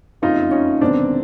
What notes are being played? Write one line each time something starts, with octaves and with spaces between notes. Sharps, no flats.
F#1 F2 C#3 D#4 F4
C#4 D#4
E1 E2 C3 D#3 C4 D4